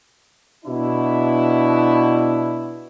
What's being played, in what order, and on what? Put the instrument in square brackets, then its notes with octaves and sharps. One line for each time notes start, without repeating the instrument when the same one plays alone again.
[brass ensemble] B2 D4 E4